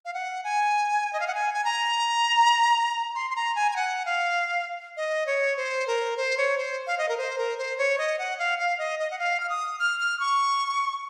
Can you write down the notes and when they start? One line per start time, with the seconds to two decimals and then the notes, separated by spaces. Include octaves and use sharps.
0.05 F5
0.14 F#5
0.44 G#5
1.13 D#5
1.20 F5
1.27 F#5
1.35 G#5
1.54 G#5
1.65 A#5
3.15 C6
3.31 C6
3.36 A#5
3.56 G#5
3.71 G#5
3.76 F#5
4.06 F5
4.97 D#5
5.26 C#5
5.57 C5
5.87 A#4
6.17 C5
6.37 C#5
6.58 C5
6.87 F5
6.98 D#5
7.09 A#4
7.18 C5
7.38 A#4
7.58 C5
7.78 C#5
7.98 D#5
8.19 F#5
8.39 F5
8.59 F5
8.78 D#5
8.99 D#5
9.11 F#5
9.19 F5
9.40 F6
9.49 D#6
9.79 F6
10.00 F6
10.20 C#6